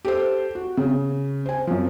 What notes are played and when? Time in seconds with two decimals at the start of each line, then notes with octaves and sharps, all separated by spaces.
0.05 G4 A4 C5
0.55 F#4
0.77 C#3
1.46 C5 G#5
1.67 F#2 F3